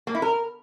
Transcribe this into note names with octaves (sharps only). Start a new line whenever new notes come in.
A#3
E4
A#4